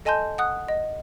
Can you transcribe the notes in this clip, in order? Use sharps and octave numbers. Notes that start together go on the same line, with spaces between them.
A4 D#5 G#5 A5 C6 G6
F#5 D#6 F#6
D#5